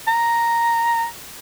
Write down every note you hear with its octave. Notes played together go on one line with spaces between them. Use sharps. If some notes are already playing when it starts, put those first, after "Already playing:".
A#5